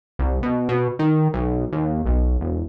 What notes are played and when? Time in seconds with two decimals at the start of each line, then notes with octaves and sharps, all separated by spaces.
0.19 C2
0.43 B2
0.69 B2
0.99 D#3
1.34 B1
1.72 D#2
2.06 B1
2.41 E1